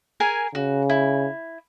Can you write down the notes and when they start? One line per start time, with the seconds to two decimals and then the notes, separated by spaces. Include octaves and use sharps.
0.20 G#4 A#4 G#5
0.55 C#3 F#4
0.90 E4